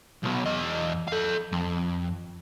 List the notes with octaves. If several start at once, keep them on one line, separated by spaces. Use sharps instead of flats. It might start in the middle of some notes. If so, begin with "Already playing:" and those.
B1 B2
E2 D#5
A4 F5
F2